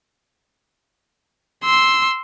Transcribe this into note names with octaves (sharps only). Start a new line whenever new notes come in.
C6 E6